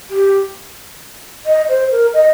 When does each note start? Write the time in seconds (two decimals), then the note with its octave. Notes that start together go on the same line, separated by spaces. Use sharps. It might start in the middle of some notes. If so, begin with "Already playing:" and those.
0.10 G4
1.46 D#5
1.69 C5
1.91 A#4
2.14 D#5